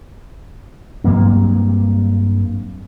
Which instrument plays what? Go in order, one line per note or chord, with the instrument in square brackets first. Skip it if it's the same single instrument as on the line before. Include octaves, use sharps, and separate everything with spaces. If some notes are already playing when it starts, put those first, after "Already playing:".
[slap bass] G2 F#3 A#3 C4